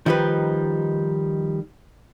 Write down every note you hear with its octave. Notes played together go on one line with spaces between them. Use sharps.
D#3 F3 G3 D#4 B4